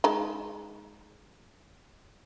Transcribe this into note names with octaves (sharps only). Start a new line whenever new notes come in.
G#3 D#4 A5